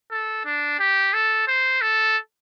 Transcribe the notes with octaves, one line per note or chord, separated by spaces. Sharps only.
A4
D4
G4
A4
C5
A4